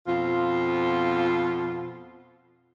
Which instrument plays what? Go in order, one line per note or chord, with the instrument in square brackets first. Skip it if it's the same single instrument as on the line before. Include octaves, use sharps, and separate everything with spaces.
[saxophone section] F2 B2 F4